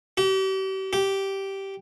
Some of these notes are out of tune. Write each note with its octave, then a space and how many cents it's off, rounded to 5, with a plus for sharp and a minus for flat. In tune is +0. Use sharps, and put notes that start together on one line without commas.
G4 -40
G4 -10